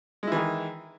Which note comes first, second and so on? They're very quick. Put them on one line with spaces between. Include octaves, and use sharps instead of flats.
G#3 E4 E3 D#3